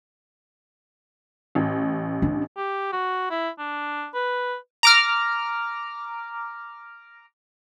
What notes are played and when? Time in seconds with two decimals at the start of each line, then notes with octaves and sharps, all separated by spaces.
1.55 A1
2.22 D4
2.57 G4
2.92 F#4
3.31 E4
3.59 D4
4.14 B4
4.83 A#5 D6 F6